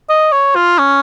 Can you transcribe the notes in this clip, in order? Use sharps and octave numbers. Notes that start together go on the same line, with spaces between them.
D#5
C#5
F4
C#4